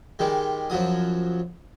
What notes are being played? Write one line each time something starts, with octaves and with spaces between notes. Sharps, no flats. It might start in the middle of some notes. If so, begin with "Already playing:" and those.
D#3 G3 G#3
F#2 F3 F#3 D#6